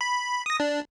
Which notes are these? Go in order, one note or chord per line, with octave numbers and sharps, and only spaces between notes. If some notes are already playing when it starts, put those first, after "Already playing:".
B5
D#6 A#6
D4